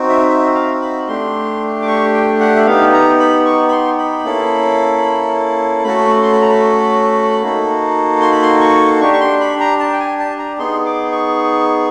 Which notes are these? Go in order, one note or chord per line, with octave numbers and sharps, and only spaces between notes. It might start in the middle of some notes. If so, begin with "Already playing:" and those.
Already playing: C4 D#4 F#4
E5
E5
F5
B5
A3 D4 G4 C6
D6
C#6
G5
F#5
E5
B3 D#4 G4 F5
A#5
B5
C#6
B5
C6
B5
A#3 C#4 E4 A4
A3 C#4 F#4 A4 B5
C6
B5
A#5
B5
A#3 D#4 F#4 A4
C6
B5
C6
C#6
D4 G4 C#6
C#6
C6
B5
A#5
A5
G5
G#5
A5
A#5
B3 D#4 G#4 C6
D6
C#6